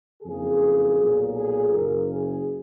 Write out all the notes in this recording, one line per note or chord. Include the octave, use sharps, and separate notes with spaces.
F#1 F2 C#3 G#4
B1 A#2
G#4
F#1 F#2 C#3 A#4
G#4